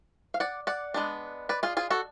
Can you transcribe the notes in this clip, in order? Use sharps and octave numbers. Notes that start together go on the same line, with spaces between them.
F5
D5 F#5
D5 F#5
G#3 B3 D4
B4 D5
F4 G#4
F4 G#4
F#4 A4